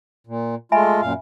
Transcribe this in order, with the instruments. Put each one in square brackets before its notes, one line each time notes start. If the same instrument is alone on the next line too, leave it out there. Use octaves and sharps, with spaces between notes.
[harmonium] A#2
[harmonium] G#3 A3 F4 [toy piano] E5 G#5 B5
[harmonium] F#2 A#2 F5